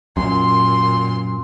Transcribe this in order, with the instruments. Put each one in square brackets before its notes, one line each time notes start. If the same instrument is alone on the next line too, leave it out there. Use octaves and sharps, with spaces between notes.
[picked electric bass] F#2 [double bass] A#2 [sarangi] C6